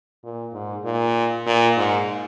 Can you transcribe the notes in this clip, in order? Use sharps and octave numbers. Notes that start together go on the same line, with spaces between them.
A#2
G#2
A#2
A#2
G#2